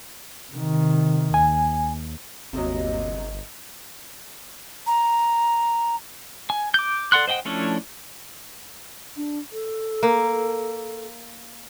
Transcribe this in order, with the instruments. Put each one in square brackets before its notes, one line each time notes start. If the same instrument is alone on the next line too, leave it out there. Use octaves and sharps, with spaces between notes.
[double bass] C3 D#3
[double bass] D#2 [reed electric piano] G#5
[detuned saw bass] G1 [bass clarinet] D#2 [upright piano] C3 F#3 [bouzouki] A4 A#4 D#5
[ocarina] A#5
[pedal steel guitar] G#5
D6 G6
A4 D5 F#5 C6 F#6
C5 D#5 F#5 G5
F3 A3 C#4 D4 E4
[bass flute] D4
A4
[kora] A#3